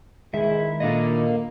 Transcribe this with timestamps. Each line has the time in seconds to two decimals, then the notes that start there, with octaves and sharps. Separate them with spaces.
0.34 D#3 G#3 E4 E5
0.80 A#2 A#3 D4 A4 D#5